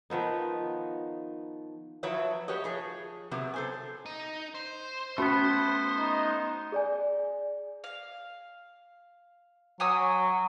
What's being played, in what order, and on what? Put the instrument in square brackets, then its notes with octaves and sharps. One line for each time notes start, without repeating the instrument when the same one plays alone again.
[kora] D#3 F3 B3 D#4
[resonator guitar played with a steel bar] F3 F#3 E4 B4 C#5 E5
F#4 G4 B4 C#5 D#5
F3 G#4 C#5
C3 F#3 B3
A4 C5 G#5
[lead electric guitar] D#4
C5
[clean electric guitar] A3 B3 [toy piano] C#4 F#4 [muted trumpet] B5
[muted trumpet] D#4
[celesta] G#4 D5 G#5
[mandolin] F5
[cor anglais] F#3 [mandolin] G#5 D#6 E6